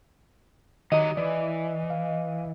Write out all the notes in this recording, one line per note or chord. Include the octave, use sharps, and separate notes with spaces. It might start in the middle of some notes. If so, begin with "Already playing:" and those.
D#3 F#3 G4 D#5 A#5
E3 D5
F5